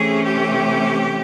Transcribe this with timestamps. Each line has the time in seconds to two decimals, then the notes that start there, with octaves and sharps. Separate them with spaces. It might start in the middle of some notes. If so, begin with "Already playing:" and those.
Already playing: C3 E3 A3 C#4 G#4
0.23 G4